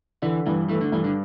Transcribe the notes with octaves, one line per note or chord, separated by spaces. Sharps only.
D3 E3
G2 E3
E3 A3
D3
G2 E3
D3